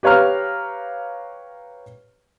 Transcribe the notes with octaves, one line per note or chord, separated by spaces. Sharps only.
G4 B4 C#5 F5 A#5 F6